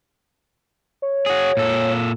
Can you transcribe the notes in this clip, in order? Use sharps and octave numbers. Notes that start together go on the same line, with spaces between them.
C#5
F#4 G#4
A#2 A4